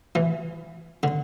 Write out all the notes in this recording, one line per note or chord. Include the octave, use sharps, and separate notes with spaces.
E3
D3